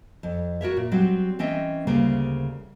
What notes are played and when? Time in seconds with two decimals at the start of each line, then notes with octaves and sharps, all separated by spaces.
0.23 F2
0.61 F#4 A#4 C#5 E5
0.77 A#2
0.92 F#3 G3 C4 F#4
1.39 E3 C4 C#4 D#5 E5
1.87 D2 C#3 G3 A#3 C5